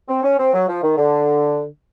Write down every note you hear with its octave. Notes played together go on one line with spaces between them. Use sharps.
C4
C#4
C4
F#3
F3
D#3
D3